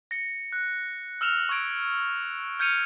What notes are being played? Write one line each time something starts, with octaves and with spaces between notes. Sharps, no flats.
A#6 C#7
F#6
E6 F6 E7 F7
C#6 E6 G#6 D7
F6 G6 G#6 C#7 D#7 F7